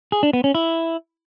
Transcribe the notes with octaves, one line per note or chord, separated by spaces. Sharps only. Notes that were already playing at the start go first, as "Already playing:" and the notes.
G#4
D4
B3
C#4
E4